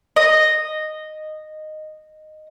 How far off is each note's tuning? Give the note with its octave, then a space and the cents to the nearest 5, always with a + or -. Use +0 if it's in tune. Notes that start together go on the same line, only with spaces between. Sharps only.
D#5 -10